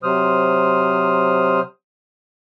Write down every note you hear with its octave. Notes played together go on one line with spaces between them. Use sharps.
C3 F#3 C5 D#6 F6